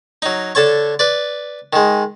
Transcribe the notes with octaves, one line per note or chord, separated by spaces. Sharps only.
F#3 D#4
D3 A4 C#5 C#6
B4 D5
D#3 G#3